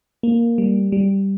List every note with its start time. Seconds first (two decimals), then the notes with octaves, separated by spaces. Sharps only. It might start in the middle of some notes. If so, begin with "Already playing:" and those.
0.23 A#3
0.58 G3
0.92 G3